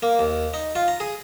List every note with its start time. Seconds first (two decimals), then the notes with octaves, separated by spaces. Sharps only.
0.03 A#3
0.19 D#2
0.54 D#4
0.75 F4
0.88 A#5
1.00 G#4